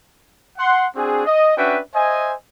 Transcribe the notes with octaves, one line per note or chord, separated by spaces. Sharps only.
F#5 C6
C4 D4 F#4 G#4
D#5
C#4 D4 F#4 B4 E5 G5
C5 D#5 E5 G#5